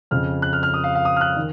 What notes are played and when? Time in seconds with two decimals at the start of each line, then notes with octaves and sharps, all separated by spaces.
0.11 F2 C#3 F6
0.42 F#6
0.53 F6
0.63 F6
0.74 D#6
0.84 F5
0.95 F5
1.05 D#6
1.16 F6
1.21 F#6
1.37 D#3